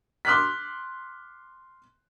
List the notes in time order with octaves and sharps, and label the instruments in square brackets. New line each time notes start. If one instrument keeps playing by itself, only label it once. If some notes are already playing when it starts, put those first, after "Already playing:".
[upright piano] C6 D6 F6 F#6 B6